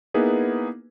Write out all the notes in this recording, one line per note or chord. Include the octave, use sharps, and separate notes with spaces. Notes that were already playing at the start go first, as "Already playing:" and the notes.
A#3 B3 D#4 E4 G#4 B4